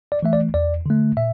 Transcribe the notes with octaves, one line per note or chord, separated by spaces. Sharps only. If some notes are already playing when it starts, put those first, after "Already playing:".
D5
E3 A3 E5
D5
E2 D5
D3 A3
A#2 E5